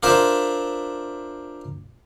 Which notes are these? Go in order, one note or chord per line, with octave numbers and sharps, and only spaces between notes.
D4 F4 A#4 C5 E5